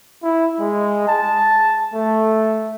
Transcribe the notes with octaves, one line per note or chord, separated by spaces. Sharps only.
E4
G#3
A5
A3